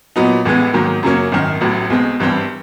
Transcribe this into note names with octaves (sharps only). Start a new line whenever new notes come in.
A#2 F#3 B3 D#4
A1 A2 E3 G#3 B3
G#2 D#3 F#3 A#3
F#2 C#3 F#3 A#3 C#4
G#1 F#2 D#3
A1 A2 F#3
B1 B2 G#3 C4
G#1 G2 E3 G3 C4